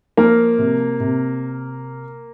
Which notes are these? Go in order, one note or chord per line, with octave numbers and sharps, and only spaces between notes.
F3 A#3 A#4
C3
C3